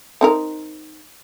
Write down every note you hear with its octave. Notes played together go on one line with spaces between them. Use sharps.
C4 D#4 A#4